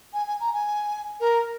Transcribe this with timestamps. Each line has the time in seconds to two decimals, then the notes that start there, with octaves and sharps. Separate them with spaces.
0.13 G#5
0.27 G#5
0.40 A#5
0.53 G#5
1.20 A#4